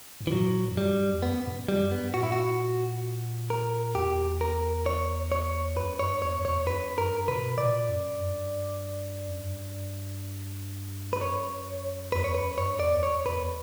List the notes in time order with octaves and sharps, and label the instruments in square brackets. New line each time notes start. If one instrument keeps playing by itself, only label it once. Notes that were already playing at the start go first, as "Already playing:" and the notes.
[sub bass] G2
[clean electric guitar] E3
[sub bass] A#2 [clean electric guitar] F#3
[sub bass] F#2
[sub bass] G2 [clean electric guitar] G3
[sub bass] E2
[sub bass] F#2 [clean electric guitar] B3
[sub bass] G2
F#2
[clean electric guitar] G3
[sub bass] G2
[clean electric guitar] B3
[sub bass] A#2 [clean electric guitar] F#4
[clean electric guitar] E4
F#4
A#4
[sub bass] E2 [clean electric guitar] G4
[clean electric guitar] A#4
C#5
C#5
[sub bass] F#2 [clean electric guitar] B4
[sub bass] G2 [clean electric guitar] C#5
[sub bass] E2 [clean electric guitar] C#5
[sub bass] E2 [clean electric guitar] C#5
[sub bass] F#2 [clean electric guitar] B4
[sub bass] G2 [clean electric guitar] A#4
[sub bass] B2 [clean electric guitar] B4
[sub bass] A#2 [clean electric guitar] D5
[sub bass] F#2
G2
F#2
G2
[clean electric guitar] B4
[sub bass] F#2 [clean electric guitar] C#5
[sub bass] E2 [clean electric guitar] B4
[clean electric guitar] C#5
[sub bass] F#2 [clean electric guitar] B4
[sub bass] G2 [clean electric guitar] C#5
[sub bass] E2 [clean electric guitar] D5
[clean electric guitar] C#5
[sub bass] E2 [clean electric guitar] B4